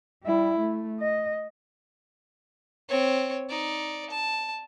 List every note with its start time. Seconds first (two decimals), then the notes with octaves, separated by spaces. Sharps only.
0.23 G3 E4
0.58 A3
1.00 D#5
2.89 C4 C#5
3.49 D#4 D5
4.10 A5